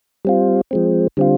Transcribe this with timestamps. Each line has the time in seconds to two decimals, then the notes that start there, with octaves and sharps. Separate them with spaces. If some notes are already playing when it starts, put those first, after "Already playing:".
0.25 G3 C4 F4
0.71 F3 G#3 C4
1.17 D3 G3 C4 F4